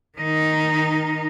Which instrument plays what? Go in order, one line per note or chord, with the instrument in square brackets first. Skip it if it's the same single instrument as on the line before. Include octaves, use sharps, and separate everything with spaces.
[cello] D#3 D#4